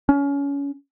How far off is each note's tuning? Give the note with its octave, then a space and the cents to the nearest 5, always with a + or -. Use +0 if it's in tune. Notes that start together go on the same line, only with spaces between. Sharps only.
C#4 +25